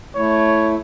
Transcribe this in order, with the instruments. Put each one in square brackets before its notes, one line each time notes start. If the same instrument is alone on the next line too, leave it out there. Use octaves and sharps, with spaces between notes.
[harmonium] A3 E4 [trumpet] C#5